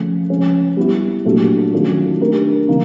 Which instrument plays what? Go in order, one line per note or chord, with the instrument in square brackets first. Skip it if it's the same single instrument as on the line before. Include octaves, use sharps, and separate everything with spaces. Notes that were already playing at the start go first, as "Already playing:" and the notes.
Already playing: [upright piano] C#3 F3 A3
F3 G#3 C#4
G3 B3 E4 G4
A#2 F#3 A3 D4 G4
D#3 F#3 A3 C#4 F4
A3 D4 G4 A#4
D3 F3 A#3 D#4